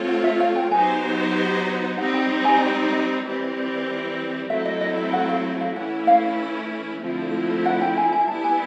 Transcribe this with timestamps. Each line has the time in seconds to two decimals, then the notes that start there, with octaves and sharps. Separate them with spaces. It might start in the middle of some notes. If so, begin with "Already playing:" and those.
Already playing: A3 C4 F4 A4 C#5
0.08 F#5
0.24 E5
0.40 F5
0.56 G5
0.71 F#3 B3 D#4 G4 C5 G#5
1.97 G3 C4 D#4 F#5
2.13 G5
2.45 G#5
2.61 G5
2.93 D#5
3.24 E3 G3 C4
4.50 F#3 A3 C4 E4 A4 E5
4.65 D#5
4.81 D#5
4.97 E5
5.13 F#5
5.29 F5
5.61 F5
5.76 E3 A3 C#4 E4 F#5
6.07 F5
7.02 D3 F3 A3 C4 E4
7.65 F#5
7.81 G5
7.97 G#5
8.13 G#5
8.28 G3 B3 E4 A5
8.44 G#5